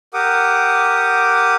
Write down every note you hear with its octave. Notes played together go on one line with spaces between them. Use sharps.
G4 A#4 F#5 D6 D#6